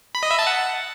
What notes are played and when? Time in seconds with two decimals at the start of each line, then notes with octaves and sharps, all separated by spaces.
0.15 B5
0.23 D#5
0.31 E5
0.39 A5
0.47 F#5